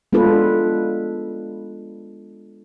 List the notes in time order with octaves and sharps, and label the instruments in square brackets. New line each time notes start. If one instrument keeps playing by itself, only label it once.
[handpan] G#3 B3 D4 F4 A4 B4